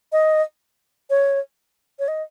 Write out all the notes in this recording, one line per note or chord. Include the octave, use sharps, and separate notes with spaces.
D#5
C#5
C#5
D#5